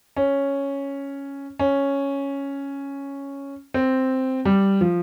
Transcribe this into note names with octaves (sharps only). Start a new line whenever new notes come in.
C#4
C#4
C4
G3
F3